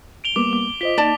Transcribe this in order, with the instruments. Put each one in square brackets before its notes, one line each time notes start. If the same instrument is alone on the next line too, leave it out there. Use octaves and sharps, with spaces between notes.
[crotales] D7 F7 G7
[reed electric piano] G3 A#3 B3 [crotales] D6
[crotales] D6
[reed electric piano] F4 C5 D#5 [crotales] B6 G7
[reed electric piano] A#3 D#4 [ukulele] D5 A5